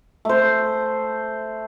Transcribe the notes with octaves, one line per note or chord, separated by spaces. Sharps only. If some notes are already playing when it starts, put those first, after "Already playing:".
A3 C5